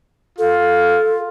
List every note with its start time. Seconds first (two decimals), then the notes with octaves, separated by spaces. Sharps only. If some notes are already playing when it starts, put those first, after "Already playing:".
0.39 F4 A4